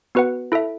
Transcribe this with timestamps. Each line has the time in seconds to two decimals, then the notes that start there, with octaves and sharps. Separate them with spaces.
0.15 B3 F#4 B4 F#5
0.52 E4 A4 E5